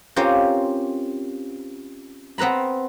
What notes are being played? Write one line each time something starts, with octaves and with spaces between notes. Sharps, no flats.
C4 C#4 F4 G4 A#4 C5
B3 C4 B4 A#5 B5